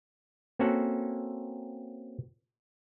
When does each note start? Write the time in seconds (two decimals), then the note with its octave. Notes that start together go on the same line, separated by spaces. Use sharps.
0.59 A#3 C4 C#4 F#4 A4 F#5